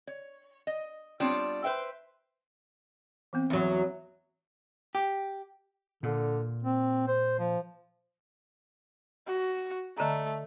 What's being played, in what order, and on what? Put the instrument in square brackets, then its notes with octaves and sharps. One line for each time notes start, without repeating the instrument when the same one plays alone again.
[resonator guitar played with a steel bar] C#5
D#5
G3 B3 C4 D4 F4 C#5
B4 C5 E5 G5
[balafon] E3 B3 C4
[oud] E2 F#3
[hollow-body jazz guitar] G4
[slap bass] A#2 [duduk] D3
[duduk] C4
C5
F3
[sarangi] F#4
[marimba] D3 D#5 A#5 [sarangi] A3